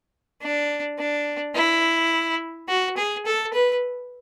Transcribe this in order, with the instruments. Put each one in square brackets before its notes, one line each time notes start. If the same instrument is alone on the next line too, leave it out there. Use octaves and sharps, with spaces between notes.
[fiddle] D4
D4
E4
F#4
G#4
A4
B4